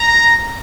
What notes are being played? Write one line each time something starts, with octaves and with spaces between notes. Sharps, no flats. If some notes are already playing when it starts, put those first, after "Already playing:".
Already playing: A#5